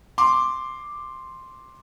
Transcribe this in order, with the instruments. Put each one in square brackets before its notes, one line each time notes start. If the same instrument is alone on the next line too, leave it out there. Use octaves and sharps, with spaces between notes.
[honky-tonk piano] C6 D6